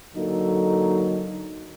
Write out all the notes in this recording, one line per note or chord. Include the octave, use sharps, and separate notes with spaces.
D3 F#3 A#3 D#4 A4